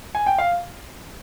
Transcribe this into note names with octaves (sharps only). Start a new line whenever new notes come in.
G#5
G5
F5